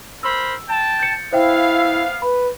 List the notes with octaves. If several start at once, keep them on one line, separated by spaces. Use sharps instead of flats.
A#4 C5 B5 E6
G5 A5
G6 A6 C#7
B3 E4 C5 E5 F5 G5
B4 B5